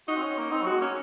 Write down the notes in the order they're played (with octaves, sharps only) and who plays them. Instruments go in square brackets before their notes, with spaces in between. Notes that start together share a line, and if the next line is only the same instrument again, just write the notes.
[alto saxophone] D#4 [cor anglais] F#4
[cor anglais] C4
C#4
A#3
[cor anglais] C4 [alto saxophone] D#4
[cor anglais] F#3
[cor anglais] G#3 [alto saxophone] F#4
[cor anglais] A#3 [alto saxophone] C#4